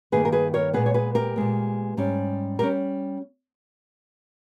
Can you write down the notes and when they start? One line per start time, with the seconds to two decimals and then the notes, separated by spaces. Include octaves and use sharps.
0.12 G2 D#3 A#3 G#4 B4
0.25 A#4
0.32 G#4 B4
0.54 A#4 C#5
0.73 A#2 G#3 B3 G#4 B4
0.86 C#5
0.94 G#4 B4
1.15 G4 A#4
1.36 A#2 G#3 B3
1.97 G#2 G3 C#4
2.59 G3 C#4 G4 A#4